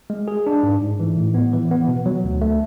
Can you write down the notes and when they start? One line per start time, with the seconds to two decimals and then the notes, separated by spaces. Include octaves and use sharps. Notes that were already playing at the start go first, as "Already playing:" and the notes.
0.10 G#3
0.28 G#4
0.47 D4
0.63 G#2
0.82 G#2
1.00 E3
1.17 A2
1.34 B3
1.53 E3
1.71 B3
1.88 B2
2.06 F#3
2.24 D2
2.42 A3